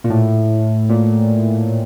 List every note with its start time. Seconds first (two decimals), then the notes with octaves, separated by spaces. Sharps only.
0.04 A#2
0.10 A2
0.89 A#2